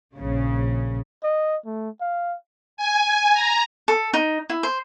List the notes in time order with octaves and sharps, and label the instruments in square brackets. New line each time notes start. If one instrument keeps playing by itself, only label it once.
[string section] A#1 C#3
[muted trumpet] D#5
A3
F5
[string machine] G#5
A#5
[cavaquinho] A4
D#4
E4
C5